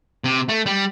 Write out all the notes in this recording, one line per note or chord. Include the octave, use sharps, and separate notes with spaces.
C3
A3
G3